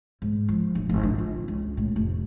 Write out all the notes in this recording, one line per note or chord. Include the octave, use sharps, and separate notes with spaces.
G#2
F3
D1
G#1
D3
F4
C#2
A2
F1